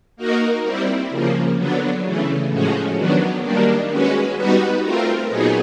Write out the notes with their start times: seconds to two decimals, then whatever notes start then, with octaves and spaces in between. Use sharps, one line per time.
0.17 A#3 D#4 F#4 A#4
0.63 G3 C4 E4
1.10 C#3 F3 A#3
1.56 D3 F#3 B3 D4
2.03 C#3 E3 A3
2.49 A2 F3 G#3 C#4 F#4
2.96 D#3 F#3 B3 D4
3.42 D#3 G3 A#3 D4
3.89 G#3 C#4 F#4 B4
4.36 G3 B3 D#4 F#4 B4
4.82 A3 C4 F4 A#4
5.29 A#2 F#3 B3 D#4 G#4